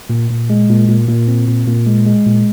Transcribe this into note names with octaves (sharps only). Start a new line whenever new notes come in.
A#2
A#2
G#3
A#2
A#2
A#2
C4
A#2
A#2
G#3
G#3
A#2